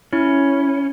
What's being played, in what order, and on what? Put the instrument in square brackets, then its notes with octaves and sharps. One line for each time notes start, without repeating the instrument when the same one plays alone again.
[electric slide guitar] C#4 [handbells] E4